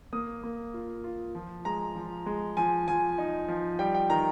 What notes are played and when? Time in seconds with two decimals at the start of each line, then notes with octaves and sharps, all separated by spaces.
0.13 A#3 D#6
0.43 A#3
0.74 F4
1.04 F4
1.35 F3
1.65 G#3 A#5
1.96 F3
2.26 G#3
2.57 F3 G#5
2.88 F3 G#5
3.18 D#4
3.48 F3
3.79 G3 G5
3.94 G5
4.10 D#3 A#5